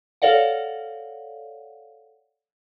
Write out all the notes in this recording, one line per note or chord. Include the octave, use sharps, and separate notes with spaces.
A4 C#5 D5 F5 F#5